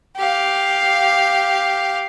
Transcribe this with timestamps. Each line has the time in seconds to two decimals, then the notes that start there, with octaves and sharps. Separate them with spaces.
0.17 G4 F5